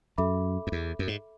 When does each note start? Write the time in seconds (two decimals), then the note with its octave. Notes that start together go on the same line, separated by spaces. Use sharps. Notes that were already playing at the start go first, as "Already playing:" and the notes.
0.18 F#2 A4 E5 B5 D6
0.67 F#2
0.72 E2
0.99 F#2
1.07 G#2